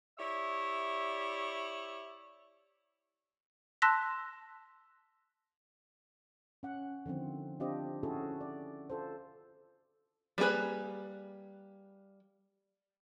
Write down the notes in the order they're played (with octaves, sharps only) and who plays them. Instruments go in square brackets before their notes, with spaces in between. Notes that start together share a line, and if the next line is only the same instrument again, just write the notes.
[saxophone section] E4 G4 C#5 D5 E5
[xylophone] A5 C6 E6 F#6 A#6 B6
[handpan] C#4 F#5
D3 D#3 F3 C4
C4 D4 F4 G4 C5 D#5
C#4 E4 F#4 G#4 A4
D5
F4 A4 C5
[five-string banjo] G3 A#3 E4 G#4 B4